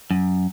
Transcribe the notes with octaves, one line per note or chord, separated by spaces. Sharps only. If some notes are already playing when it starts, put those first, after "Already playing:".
F#2